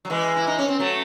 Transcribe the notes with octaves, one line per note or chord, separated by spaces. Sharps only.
F#3
E3 G#3
E4
D#4
C#4
C4
F#3 A3